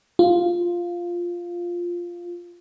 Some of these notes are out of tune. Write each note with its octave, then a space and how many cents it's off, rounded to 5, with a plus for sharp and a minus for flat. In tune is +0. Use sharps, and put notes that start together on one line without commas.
F4 +0